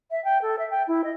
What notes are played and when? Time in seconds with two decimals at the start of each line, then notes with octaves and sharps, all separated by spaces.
0.10 E5
0.24 G5
0.42 A4
0.58 E5
0.70 G5
0.87 E4
1.04 D#5